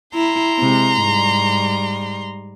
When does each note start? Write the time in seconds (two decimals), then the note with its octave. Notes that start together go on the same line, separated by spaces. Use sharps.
0.15 E4 A#5 C6
0.59 C3 G#3
1.03 G#2 G3